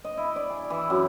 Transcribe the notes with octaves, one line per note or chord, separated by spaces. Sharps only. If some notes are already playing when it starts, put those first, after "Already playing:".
D#5
E4
D5
G#4
E3
F#2